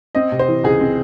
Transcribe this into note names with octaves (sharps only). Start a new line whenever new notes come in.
C4 D#5
C3
C5
E3
C#2 G#4
C4